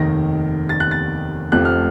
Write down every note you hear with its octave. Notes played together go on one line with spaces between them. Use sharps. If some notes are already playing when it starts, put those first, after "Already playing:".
Already playing: F1 D#2 D#3 A#6
A6
F#6
A6
F1 F2 C3 F3 A3 F#6
F6